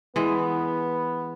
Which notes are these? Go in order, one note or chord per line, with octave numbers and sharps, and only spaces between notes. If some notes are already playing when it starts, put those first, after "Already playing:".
E3 G#3 B3